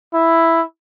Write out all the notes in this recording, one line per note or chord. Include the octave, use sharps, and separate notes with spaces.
E4